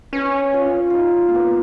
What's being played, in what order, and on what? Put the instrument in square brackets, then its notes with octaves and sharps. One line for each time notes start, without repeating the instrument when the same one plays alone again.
[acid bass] C#4 [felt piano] B4
[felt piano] F4
F4
D#4
A#3
B3